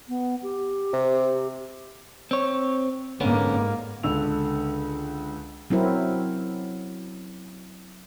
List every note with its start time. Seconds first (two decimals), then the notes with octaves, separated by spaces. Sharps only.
0.09 B3
0.43 G4
0.93 C3
1.13 G4
2.31 C4 C#5
3.21 G#2 D3 A#3 B3 C#4
4.03 C#2 D3 E6 F7
5.70 F#3 C4 E4 A#4